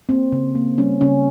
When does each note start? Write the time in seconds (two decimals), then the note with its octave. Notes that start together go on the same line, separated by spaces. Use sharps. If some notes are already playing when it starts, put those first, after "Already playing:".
0.09 A#3 C4
0.32 C#3
0.55 A#3
0.78 G3 C#4
1.01 C#3 C#4